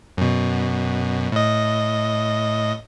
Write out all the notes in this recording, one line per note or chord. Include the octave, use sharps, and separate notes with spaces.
F#2 B2
A2 D#5